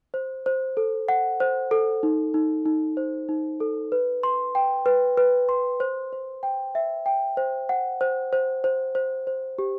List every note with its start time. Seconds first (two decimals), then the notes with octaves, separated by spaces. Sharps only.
0.14 C5
0.46 C5
0.77 A4
1.09 F#5
1.40 C5
1.71 A4
2.03 D#4
2.34 D#4
2.66 D#4
2.97 C5
3.29 D#4
3.60 A4
3.92 B4
4.23 C6
4.55 G5
4.86 B4
5.17 B4
5.49 C6
5.80 C5
6.13 C5
6.43 G5
6.75 E5
7.06 G5
7.37 C5
7.69 F#5
8.01 C5
8.33 C5
8.64 C5
8.95 C5
9.27 C5
9.58 G4